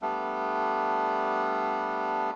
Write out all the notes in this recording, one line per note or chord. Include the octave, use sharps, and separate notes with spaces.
G3 A3 B3 D4